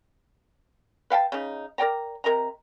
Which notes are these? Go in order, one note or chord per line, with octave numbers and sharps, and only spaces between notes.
B4 F5 G5 A5
C#3 D#4
A#4 D5 G5 A#5
C3 A#4 D#5 A#5